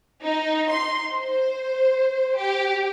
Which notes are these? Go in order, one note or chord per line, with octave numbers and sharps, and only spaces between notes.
D#4
C6
C5
G4